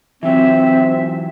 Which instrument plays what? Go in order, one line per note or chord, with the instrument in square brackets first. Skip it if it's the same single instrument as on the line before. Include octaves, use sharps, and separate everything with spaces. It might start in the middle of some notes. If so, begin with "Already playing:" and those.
[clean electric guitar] E3 F#3 [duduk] C4 [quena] E5